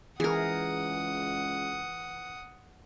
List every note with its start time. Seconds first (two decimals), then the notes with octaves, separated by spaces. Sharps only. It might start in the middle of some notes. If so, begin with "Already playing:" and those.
0.20 C#2 E3 G#4 A#4 F#5 D#6